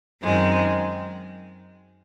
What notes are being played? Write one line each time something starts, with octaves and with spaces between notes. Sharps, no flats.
F#2 D#3 G#3 C4